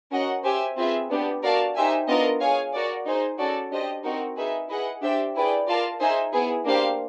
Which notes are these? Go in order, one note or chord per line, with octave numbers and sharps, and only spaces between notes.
C#4 F#4 A#4 D#5 F#5
G4 C5 E5 G#5
C4 F4 G#4 B4 E5
B3 D4 G4
F#4 A#4 D5 F5 A5
D#4 G4 C5 E5 G#5
B3 D4 F4 A#4 D#5
G#4 C#5 F5 G#5
F#4 A#4 D5
D#4 G#4 C5
C#4 F#4 A4 D5
D4 G4 C5 D#5
C4 D#4 F#4 A#4
D#4 G#4 B4 E5
E4 G#4 B4 D#5 F#5
D4 G4 C5 E5 G5
E4 G#4 B4 D5 G5
F4 A#4 D5 F5 A5
D#4 G#4 C5 E5 G#5
B3 E4 G#4
A#3 D4 G4 C5 F5